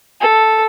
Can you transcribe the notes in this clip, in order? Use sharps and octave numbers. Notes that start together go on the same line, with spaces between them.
A4